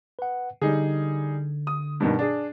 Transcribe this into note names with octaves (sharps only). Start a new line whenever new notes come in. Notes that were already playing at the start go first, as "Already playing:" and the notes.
B4 F#5
D3 G3 D#4 G#4
D#6
G2 B2 D#3
D4 G#4